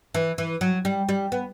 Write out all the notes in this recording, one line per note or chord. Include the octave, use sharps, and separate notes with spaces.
E3
E3
F#3
G3
G3
B3